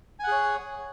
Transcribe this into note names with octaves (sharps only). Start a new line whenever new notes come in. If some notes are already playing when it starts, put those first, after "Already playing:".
G#4 C#5 F#5 G#5